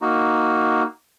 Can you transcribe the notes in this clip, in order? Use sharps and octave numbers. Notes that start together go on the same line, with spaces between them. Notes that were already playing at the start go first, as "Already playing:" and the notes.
A#3 D#4 F#4